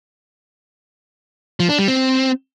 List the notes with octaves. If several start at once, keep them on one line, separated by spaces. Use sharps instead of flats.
F3
D4
G3
C4